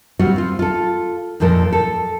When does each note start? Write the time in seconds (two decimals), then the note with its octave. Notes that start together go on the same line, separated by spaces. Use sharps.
0.19 G3 C4 F4 F#4
0.36 C4 F4
0.59 F4 A4
1.40 F2 A#2 F3 A4 A#4
1.73 A4